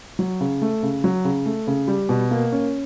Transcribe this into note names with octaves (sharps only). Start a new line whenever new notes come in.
F#3
C#3
A3
C#3
F#3
C#3
A3
C#3
G3
B2
A#3
C#4